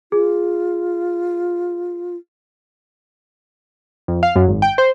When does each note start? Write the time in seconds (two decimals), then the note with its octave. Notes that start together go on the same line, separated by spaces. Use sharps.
0.12 F4 G#4
4.08 F2
4.23 F5
4.36 F#2
4.48 G#1
4.62 G5
4.78 C5